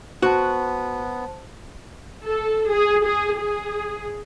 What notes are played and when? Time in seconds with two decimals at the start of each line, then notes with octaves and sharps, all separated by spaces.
0.22 B3 F#4 C5 A5
2.25 A4
2.71 G#4
3.04 G#4
3.36 G#4